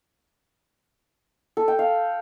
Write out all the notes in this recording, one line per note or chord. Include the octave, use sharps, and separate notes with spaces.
A4
G5
F5